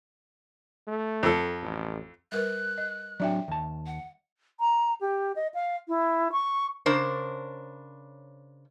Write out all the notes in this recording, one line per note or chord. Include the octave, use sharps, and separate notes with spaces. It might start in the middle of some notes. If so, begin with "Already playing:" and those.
A3
F2 A4
A1
G3 A#4 B4 F#6
D#5
F#3 D4 F#4 D5 E5 G5
D#2 A5
F#5
A#5
G4
D#5
F5
E4
C#6
C#3 D4 A#4 C5